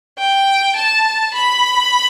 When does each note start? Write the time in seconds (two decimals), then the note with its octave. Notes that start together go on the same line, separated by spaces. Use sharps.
0.18 G5
0.76 A5
1.35 B5